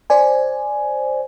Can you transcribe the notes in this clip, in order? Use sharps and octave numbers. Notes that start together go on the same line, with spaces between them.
C5 D5 G#5